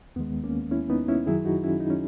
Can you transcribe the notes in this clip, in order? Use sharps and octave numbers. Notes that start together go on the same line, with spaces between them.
D#2 D#3 G#3 B3
A#3 C#4
C#4 E4
B3 D#4
C#4 E4
F#2 D#3 F#3 E4 G#4
D#4 F#4
C#4 E4
D#4
C#4